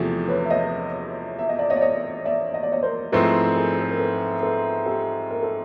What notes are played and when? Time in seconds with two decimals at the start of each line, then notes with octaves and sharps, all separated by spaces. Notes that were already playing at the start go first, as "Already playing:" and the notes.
Already playing: E2 C3 F3 A3 E4 F#4 G#4
0.28 B4 C#5
0.45 E5
0.50 C#5 D#5
1.39 E5
1.49 D#5
1.59 D5
1.70 C#5 D#5
1.76 D5
1.81 C#5 D#5
2.25 D5 E5
2.54 D#5
2.63 D5
2.72 C#5 D#5
2.83 A#4 C5
3.12 G#2 F3 A3 C4 E4 A4 B4
3.56 G#4 A#4
3.80 A4
3.90 A#4
3.99 A4 B4
4.42 A4 B4
4.86 G4 A4
5.30 A#4
5.43 A4